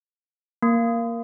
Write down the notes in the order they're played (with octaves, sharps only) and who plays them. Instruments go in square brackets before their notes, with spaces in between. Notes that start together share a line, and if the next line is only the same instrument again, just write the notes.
[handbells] A#3